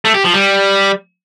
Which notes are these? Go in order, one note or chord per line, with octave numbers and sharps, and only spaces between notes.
A3
G4
F3
G3